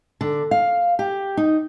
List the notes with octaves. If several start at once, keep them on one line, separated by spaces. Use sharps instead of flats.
D3
F5
G4
D#4